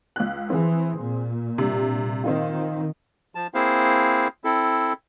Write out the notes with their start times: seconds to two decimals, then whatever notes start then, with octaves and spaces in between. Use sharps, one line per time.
0.16 C#2 F#6
0.50 E3 C4 G#4
0.99 A#2
1.58 G2 C3
2.24 D#3 C4 D#4 F4
3.35 F3 A5
3.54 A#3 C4 E4 G#4 C5 F5
4.44 C4 E4 A4